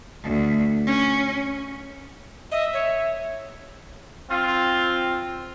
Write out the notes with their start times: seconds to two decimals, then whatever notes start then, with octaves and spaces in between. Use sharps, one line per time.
0.24 D2
0.86 C#4
2.51 D#5 E5
2.74 C#5
4.30 C4 F4